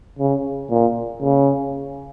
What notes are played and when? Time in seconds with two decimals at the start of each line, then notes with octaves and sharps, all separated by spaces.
0.19 C#3
0.70 A#2
1.22 C#3